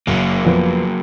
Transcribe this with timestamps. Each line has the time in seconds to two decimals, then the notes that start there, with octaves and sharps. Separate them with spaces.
0.07 F#1 F#3 A#3
0.45 F2 F3 B3